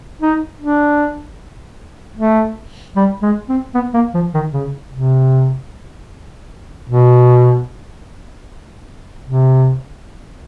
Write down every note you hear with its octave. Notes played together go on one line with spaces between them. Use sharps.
D#4
D4
A3
G3
G#3
C4
B3
A#3
F3
D#3
C#3
C3
B2
C3